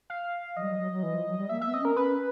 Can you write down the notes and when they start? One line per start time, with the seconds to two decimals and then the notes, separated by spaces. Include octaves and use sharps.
0.10 F5
0.56 F3 D#5
0.62 G3
0.68 F#3
0.79 F#3
0.92 F#3
1.03 E3
1.14 F3
1.27 F#3
1.38 G3
1.49 A#3 E5
1.61 B3 E5
1.74 C4 D#5
1.80 C#4 A#4
1.96 C#4 B4